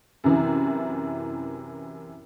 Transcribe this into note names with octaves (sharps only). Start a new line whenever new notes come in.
F#2 C3 E3